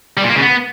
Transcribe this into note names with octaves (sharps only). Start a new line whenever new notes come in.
G3
A#2
A#3
C#3
B3